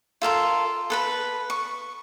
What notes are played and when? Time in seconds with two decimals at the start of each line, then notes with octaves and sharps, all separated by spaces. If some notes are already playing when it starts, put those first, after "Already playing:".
0.22 F4 A4 A#4 C6
0.90 A4 B4 B5
1.50 C#6